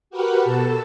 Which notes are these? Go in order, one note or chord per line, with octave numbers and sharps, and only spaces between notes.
F#4 G4 A#4 B4 F#5
B2 A4 A5